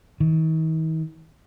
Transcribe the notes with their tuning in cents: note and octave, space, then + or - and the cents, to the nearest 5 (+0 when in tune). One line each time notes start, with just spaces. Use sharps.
D#3 +45